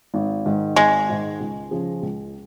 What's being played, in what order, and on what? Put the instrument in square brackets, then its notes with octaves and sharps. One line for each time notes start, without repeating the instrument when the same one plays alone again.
[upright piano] G#1
G#2 D#3
[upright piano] G#1 [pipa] G#3
[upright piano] G#2 D#3
C#2
C#3 F3 C#4 G#4
C#2